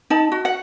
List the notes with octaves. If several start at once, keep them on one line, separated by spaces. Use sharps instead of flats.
D#4 A5
F#4
F#5